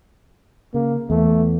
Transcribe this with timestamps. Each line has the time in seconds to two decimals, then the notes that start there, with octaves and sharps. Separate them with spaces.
0.74 C#3 A#3
1.10 E2 E3 A3